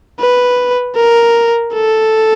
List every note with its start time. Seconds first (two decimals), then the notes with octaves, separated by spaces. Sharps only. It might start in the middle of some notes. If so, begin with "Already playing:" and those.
0.20 B4
0.96 A#4
1.74 A4